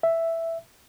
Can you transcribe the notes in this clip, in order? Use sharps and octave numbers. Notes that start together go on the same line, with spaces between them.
E5